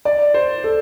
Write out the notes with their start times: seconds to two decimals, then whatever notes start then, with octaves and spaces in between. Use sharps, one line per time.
0.05 D5
0.34 C5
0.64 A4